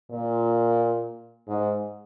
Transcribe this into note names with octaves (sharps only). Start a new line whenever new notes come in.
A#2
G#2